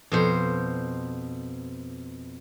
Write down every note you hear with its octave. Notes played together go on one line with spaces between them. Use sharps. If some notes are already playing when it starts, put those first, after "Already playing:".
F2 B2 C5